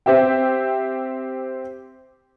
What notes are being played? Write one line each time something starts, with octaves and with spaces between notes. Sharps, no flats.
C4 G4 E5 G5